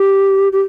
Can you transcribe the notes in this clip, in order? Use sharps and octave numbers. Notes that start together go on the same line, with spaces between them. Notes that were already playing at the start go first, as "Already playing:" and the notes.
Already playing: G4
G4